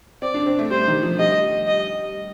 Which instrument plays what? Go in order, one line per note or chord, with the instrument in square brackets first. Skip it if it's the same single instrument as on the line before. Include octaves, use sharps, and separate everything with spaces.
[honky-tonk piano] C4 [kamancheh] D5
[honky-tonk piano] D4
C4
A3
[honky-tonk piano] G3 [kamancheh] C5
[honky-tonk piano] D#3
F3
[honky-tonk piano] G3 [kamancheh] D#5
[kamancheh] D#5